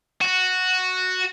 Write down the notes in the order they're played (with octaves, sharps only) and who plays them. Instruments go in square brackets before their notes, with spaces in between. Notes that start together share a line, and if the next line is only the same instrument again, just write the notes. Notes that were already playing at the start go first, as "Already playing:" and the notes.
[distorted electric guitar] F#4